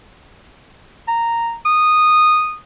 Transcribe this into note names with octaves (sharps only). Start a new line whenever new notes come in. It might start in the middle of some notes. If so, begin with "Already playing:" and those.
A#5
D#6